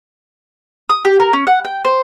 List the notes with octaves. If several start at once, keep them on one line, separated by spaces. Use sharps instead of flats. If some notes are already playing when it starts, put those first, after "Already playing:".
D#6
G4
A#4
C#4
F#5
G5
C5